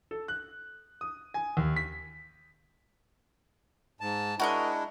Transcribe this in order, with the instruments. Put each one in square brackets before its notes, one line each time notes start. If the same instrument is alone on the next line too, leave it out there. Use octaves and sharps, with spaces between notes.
[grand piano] A4
F#6
D#6
G#5
D#2
B6
[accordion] G#2 A5
[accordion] G#3 D4 E4 [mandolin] F#4 A#4 D#5